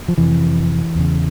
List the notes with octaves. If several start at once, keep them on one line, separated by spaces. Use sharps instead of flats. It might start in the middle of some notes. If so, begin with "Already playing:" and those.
F3
F2 C3 E3
E2 C#3